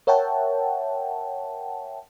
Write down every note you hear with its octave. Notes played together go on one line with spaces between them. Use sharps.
A#4 C#5 E5 F#5 G5 A5